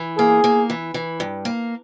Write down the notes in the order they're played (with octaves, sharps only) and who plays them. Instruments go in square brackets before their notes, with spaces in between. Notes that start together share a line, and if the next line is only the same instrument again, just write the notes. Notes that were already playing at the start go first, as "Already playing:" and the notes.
Already playing: [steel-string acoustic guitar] E3
[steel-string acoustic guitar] A#3 [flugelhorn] G#4
[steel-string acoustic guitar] A#3
E3
E3
G2
A#3